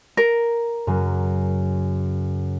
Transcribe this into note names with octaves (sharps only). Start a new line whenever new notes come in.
A#4
F#2 C#3